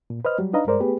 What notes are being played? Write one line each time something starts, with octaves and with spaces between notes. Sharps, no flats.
A#2
B4 C5 D#5 F6
F#3 G3
D4 D#4 B4 D#5 F5 A#5
G2 G#3 A#4 C5 D5
A3 B3 G4 G#4 B4